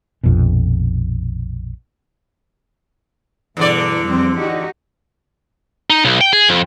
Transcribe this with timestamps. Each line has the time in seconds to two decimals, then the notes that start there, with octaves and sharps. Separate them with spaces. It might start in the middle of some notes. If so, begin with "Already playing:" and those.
0.23 A#1 F2 B2
3.57 E2 G2 B2 D3 D5
4.03 F2 G3 C4
4.38 D#4 F#4 G4
5.90 D#4
6.05 B1
6.21 G5
6.33 G#4
6.49 F2